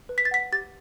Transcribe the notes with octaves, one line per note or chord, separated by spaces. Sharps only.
B4
B6
A6
F#5 B6
G4 A6